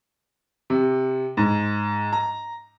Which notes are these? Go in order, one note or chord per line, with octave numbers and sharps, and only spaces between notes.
C3
G#2
A#5